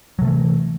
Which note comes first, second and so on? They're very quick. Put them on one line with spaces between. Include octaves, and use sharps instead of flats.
F#3 C3 A3 E3